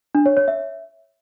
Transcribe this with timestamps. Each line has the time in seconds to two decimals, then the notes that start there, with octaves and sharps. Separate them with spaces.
0.15 D4
0.26 C#5
0.37 C#5
0.48 E5